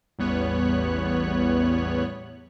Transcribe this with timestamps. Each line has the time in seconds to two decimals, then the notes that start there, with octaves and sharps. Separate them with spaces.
0.19 A1 E2 G3 B3 C#5 F#6